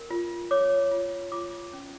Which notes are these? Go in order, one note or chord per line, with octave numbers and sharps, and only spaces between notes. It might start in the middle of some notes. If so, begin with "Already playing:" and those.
Already playing: A#4
F4
C#5 D6
F4
F4 D6
C#4